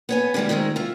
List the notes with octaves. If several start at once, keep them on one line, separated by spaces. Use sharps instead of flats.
B3 C#5 G#5
D3 D#3 G3 G#3 E4
G#2 D#3 G#3 A3
F4 E5